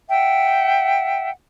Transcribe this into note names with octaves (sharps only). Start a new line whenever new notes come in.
E5 F#5 G5